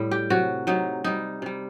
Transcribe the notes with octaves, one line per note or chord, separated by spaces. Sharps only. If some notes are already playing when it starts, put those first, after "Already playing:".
Already playing: A2 G3
G4
C3 F#3 F#4
C3 F#3 D#4
C3 G3 D#4
C3 G3